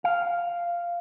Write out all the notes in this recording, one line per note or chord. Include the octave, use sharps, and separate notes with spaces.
F5